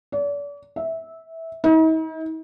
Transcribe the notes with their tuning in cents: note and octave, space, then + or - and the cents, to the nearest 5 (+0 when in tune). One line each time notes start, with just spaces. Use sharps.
D5 -40
E5 -15
D#4 +45